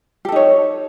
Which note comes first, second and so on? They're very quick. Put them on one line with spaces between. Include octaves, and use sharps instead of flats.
G4 A4 D#4 C#5